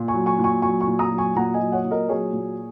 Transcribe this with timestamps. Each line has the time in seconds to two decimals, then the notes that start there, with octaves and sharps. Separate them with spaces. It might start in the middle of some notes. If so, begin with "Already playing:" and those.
Already playing: A#2
0.08 G#5 C#6
0.14 F#3
0.26 G#5 C#6
0.39 A#2
0.44 G#5 C#6
0.62 F#3 G#5 C#6
0.81 G#5 C#6
0.87 A#2
0.99 A#5 D#6
1.11 F#3
1.18 G#5 C#6
1.35 A#2 F#5 A#5
1.54 D#5 G#5
1.60 F#3
1.72 C#5 F#5
1.85 A#2
1.91 A#4 D#5
2.09 F#3 G#4 C#5
2.33 A#2